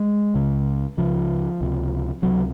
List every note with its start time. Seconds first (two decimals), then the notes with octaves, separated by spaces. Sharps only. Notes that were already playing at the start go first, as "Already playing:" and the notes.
Already playing: G#3
0.35 C#2 C#3
0.97 C#2 C#3 F3
1.61 C#2 C3
2.22 C#2 C3 F#3